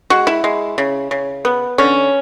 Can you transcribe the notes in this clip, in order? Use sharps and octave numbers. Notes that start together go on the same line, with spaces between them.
G#3 F#4
E4
G#3
C#3
C#3
B3
D3 C#4